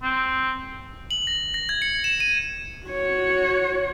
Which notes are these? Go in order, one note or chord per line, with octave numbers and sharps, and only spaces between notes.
C4
F#7
A#6
A#6
G#6
C#7
E7
D#7
F#4 C#5